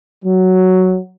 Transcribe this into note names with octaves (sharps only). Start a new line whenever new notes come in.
F#3